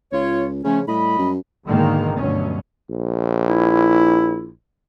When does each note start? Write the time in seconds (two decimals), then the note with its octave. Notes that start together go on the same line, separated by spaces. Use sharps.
0.12 C#2 F4 C#5
0.64 C#3 F3 A3 C#4
0.88 A2 G3 D#5 B5
1.18 F#2
1.66 G#2 B2 D3 D#3 G#3 A#3
2.17 D2 G2 B2 F#3 C#4
2.90 A#1
3.49 E4